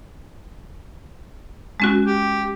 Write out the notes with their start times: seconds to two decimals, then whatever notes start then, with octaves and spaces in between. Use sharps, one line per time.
1.80 G#3 C#4 F#4
2.06 G4